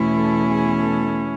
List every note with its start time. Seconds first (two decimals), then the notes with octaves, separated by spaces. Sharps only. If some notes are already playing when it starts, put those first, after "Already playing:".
Already playing: E2 B2 A3 C#4 E4
0.16 A4
0.49 G#4
0.82 A4